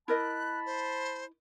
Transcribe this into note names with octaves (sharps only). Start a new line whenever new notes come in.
E4 A#4 D#5 A5 B5 F#6
C5